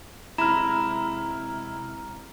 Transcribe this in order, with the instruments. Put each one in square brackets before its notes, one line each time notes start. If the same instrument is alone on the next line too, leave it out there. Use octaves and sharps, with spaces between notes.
[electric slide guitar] C3 G#3 [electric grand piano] E4 [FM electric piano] A#5 F6 [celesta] B5 E7